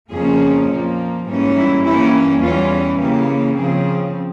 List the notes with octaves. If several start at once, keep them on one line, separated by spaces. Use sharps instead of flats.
F2 C#3 F3 A#3 C#4 G#4
A#2 F3 A#3
G#2 E3 G3 A#3 C#4
E4
G2 E3 A#3 C#4 E4
E2 E3 G3 C#4 F4
C#3 E3 A#3 C#4 G4
C#3 F3 C4 G#4